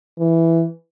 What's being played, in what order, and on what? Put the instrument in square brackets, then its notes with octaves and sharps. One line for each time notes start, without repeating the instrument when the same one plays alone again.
[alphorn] E3